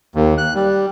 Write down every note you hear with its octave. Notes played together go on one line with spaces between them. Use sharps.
D#2
F#6
G3